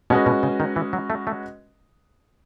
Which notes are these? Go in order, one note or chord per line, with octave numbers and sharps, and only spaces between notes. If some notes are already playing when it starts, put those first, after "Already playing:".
B2 G#3 C#4 F#4 B4 D#5
B2
C#3
D#3
E3
F#3
A3
A3